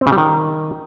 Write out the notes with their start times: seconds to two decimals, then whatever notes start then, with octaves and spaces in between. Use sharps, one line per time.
0.01 C4
0.07 C#3
0.12 G3
0.18 D#3